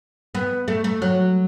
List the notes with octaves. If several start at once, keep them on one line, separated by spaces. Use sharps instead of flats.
B3
A3
A3
F#3